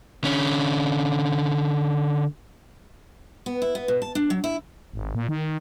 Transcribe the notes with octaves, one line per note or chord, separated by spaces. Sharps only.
D3 C#4
B3
E4
B3
B2
A5
D4
F#3
E4
G#1
A#2
D#3